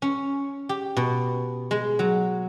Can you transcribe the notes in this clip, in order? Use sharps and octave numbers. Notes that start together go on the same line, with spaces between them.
C#4
G4
B2
G#3
F#3